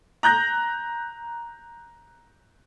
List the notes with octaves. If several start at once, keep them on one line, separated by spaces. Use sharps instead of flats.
A#5 F#6 G6 A#6